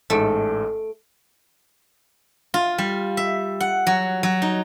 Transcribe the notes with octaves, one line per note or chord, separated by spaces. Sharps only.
A1 G#2 A3 D7
F4
G3
E5
F#5
F#3
F#3
D#4